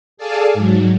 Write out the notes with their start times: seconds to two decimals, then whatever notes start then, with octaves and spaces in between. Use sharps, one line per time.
0.17 G#4 A4 D5 F5 G#5 A5
0.54 G#2 F#3